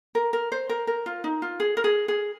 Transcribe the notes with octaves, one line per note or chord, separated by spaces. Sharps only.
A#4
A#4
C5
A#4
A#4
F4
D#4
F4
G#4
A#4
G#4
G#4